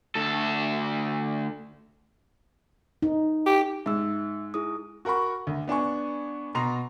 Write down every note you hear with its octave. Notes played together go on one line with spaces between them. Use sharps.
D2 A4
D#4
G4
G#2 E5 E6
E4 G#4 D#6
F#4 A#4 F#5 B5 C#6
D2
B3 D4 G#5 C#6
B2 A#5 C6 A#6 F7